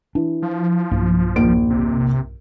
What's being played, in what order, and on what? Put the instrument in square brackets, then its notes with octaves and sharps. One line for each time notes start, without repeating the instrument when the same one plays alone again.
[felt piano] E3 [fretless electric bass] D4
[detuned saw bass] F3
[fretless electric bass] B1 G2 A#3
[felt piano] A#1 D#2 D7
[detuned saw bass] C3